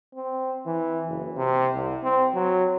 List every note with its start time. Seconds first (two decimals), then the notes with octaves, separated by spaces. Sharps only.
0.15 C4
0.66 E3
1.08 F#1
1.37 C3
1.74 C2
2.03 C4
2.34 F#3